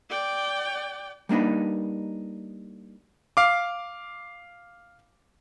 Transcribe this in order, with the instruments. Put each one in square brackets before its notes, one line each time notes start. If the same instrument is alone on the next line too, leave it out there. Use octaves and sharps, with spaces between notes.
[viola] D5 G5
[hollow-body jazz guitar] G3 A#3 D4 D#4 B4
[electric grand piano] F5 D6